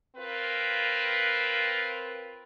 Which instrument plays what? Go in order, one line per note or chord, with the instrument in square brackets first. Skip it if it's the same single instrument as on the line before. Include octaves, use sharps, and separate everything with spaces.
[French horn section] C4 F4 A#4 B4